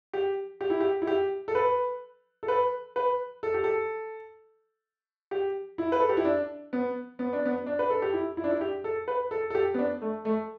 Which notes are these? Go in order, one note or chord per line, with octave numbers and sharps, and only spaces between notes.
G4
G4
E4
G4
E4
G4
A4
B4
A4
B4
B4
A4
G4
A4
G4
E4
B4
A4
G4
E4
D4
B3
B3
D4
B3
D4
B4
A4
G4
E4
E4
D4
E4
G4
A4
B4
A4
A4
G4
B3
D4
A3
A3